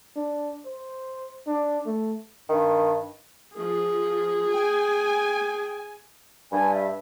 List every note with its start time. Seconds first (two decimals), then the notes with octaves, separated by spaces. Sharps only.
0.16 D4
0.66 C5
1.47 D4
1.86 A3
2.49 G2 D#3
3.57 F3 G#4
4.53 G5 G#5
6.52 G2 G#5
6.75 E5